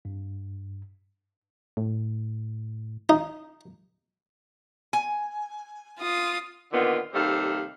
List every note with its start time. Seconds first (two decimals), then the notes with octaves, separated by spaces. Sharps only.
0.05 G2
1.77 A2
3.09 D#4
4.93 G#5
5.99 F4 D#6
6.72 A#2 D3 D#3 B3 F4
7.13 D#2 C3 G3 A4 F5